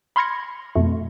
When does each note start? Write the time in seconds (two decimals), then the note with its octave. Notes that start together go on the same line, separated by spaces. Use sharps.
0.16 B5 C6 F6 G#6 A#6 C#7
0.76 F2 B2 A3